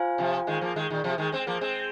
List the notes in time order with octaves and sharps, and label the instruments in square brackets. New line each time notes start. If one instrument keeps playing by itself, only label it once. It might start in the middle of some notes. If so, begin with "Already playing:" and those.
Already playing: [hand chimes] F4 C5 F5 G#5
[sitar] C3 F3
D#3 G#3
F3 A#3
D#3 G#3
A#2 D#3
C3 F3
D#3 G#3
G#3 C4
F3 A#3
G#3 C4